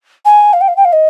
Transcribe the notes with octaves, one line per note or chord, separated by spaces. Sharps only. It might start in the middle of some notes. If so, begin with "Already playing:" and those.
G#5
F5
G5
F5
G5
F5
D#5